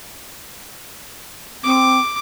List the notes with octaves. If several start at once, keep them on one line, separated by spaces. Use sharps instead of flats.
C4 D6